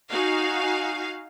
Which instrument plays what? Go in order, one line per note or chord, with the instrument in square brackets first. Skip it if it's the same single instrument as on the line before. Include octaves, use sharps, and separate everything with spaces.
[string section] D#4 F#4 F5 G#5